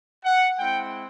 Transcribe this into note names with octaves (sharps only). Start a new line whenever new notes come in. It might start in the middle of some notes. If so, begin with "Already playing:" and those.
F#5
G#3 C4 E4 G5